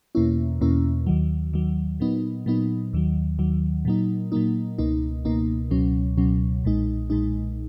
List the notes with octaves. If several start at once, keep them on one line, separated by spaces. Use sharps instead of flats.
E2 B2 A#3 C#4 E4
E2 B2 A#3 C#4 E4
D#2 D#3 F#3
D#2 D#3 F#3
A#2 F#3 B3 D#4
A#2 F#3 B3 D#4
D#2 D#3 F#3
D#2 D#3 F#3
A#2 F#3 A#3 D#4
A#2 F#3 A#3 D#4
C#2 B2 A#3 D#4
C#2 B2 A#3 D#4
C#2 B2 F#3 C#4
C#2 B2 F#3 C#4
B1 A#2 G#3 D#4
B1 A#2 G#3 D#4